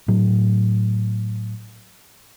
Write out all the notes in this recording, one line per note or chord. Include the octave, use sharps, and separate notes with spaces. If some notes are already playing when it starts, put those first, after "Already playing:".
A2 F#3